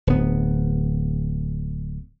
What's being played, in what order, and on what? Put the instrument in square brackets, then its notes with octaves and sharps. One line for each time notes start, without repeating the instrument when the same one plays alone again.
[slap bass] D1 B3